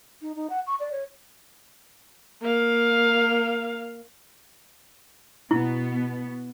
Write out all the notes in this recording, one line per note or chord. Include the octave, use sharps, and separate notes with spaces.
D#4
D#4
F#5
C#6
D5
C#5
A#3 F5
B2 B3 E4